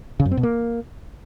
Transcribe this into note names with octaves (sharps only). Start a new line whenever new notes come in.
C#3
F#2
C4
B2
A#3